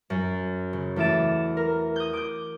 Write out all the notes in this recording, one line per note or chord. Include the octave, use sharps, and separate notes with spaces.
F#2
C#3
E2 A3 E5 D6 A6 E7
A#4
D#6 G6
D6 G6